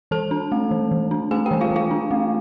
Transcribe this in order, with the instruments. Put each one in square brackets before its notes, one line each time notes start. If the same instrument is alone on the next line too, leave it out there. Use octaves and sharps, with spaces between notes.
[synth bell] E3 A4 A5
D4
A3
E3
E3
D4
A3 G#4 G#5
G4 G5
E3
F4 F5
E3 F4 F5
D4
A3